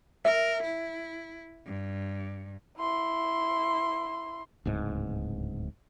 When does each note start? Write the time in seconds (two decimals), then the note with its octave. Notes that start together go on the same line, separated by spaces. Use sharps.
0.25 A#4 E5
0.63 E4
1.66 G2
2.78 E4 C6
4.65 D1 C#2 G#2